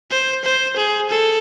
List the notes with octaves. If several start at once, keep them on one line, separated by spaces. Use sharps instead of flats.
C5
C5
G#4
A4